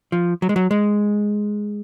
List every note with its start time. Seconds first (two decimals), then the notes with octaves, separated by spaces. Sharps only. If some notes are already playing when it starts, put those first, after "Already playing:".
0.12 F3
0.42 F#3
0.49 G#3
0.56 F#3
0.71 G#3